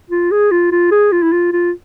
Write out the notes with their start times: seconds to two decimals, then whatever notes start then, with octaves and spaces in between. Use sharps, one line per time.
0.10 F4
0.32 G#4
0.51 F4
0.72 F4
0.92 G#4
1.12 F4
1.23 E4
1.32 F4
1.53 F4